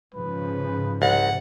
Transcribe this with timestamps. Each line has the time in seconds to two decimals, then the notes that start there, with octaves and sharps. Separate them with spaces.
0.14 G#2 C#3 F3 B4
1.02 C2 F#5